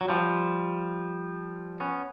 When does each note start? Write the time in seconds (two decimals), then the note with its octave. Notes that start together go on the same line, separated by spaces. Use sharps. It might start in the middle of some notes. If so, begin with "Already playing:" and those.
0.01 F#3
0.08 F3 G3
1.80 B3 C#4